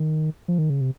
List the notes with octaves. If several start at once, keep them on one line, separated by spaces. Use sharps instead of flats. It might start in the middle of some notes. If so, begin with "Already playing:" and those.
Already playing: D#3
F3
D#3
C#3
C3